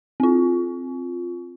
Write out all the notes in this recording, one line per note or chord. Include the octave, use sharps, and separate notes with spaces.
C4 F4